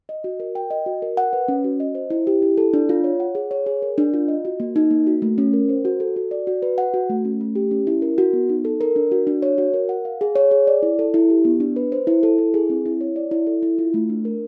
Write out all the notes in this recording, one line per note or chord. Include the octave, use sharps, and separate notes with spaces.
D#5
F#4
A#4
G5
D#5
F#4
A#4
F#5
B4
C#4
F#4
D#5
C5
E4
G4
E4
A4
D4
F4
C#5
F#5
G#4
C#5
G#4
A#4
D4
F4
D#5
F#4
A#3
D#4
A#3
F#4
A3
C#4
A#4
C5
F#4
A4
F#4
D5
F#4
B4
F#5
F#4
A3
C#4
A3
G4
C#4
E4
A#4
F#4
B3
D#4
A4
A#4
D4
F#4
D4
C#5
F#4
A#4
F#5
F5
G#4
C#5
G#4
D5
E4
A4
E4
G4
B3
D4
B4
C5
E4
A4
E4
G#4
C4
E4
C#5
D5
E4
A4
E4
F4
A3
D4
A#4